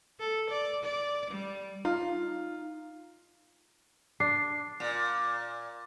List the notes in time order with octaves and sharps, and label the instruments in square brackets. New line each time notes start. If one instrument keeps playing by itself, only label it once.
[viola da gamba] A4
D5
D5
G3
[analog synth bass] D#4 [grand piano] F4
[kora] D4 [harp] C7
[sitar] A#2